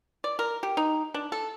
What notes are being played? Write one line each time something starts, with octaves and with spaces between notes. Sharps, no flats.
D5
A#4
G4
D#4
D4
A4